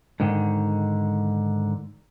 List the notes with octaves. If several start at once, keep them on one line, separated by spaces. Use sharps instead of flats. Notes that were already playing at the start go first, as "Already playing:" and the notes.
G#2 D3 D#3